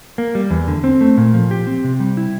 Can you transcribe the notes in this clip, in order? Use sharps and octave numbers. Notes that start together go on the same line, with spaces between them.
A#3
G3
E2
D3
C4
A3
A#2
F3
G4
C4
C3
G3
E4